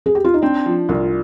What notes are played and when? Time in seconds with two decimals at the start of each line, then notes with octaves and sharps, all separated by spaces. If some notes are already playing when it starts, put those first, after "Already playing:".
0.06 G#4
0.15 G4
0.24 F4
0.34 D#4
0.42 C4 D4
0.66 F3
0.89 C2 F4